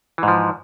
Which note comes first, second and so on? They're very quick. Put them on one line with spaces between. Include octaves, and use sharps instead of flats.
E3 G#2 F3